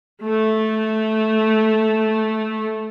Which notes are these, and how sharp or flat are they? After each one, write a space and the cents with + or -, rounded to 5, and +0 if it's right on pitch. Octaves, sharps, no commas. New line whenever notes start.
A3 -10